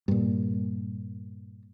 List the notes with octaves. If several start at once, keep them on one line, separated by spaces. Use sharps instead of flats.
G2 A#2